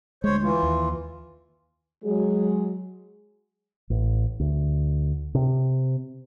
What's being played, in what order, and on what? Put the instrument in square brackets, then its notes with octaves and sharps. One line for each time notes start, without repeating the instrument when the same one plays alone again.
[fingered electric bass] D2 G#3 [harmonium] C5 C#5
[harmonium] E3 F4
[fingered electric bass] D#2
[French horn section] F#3 G#3 G#4
[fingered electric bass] A1
D2
C3